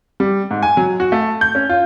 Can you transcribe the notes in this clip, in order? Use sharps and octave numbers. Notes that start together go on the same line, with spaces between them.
G3
G#2
G#5
F#3
F#4
A3
G6
C#4
F4